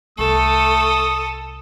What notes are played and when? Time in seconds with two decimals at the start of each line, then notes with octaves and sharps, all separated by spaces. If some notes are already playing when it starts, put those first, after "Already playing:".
0.19 C2 A3 A4 D#6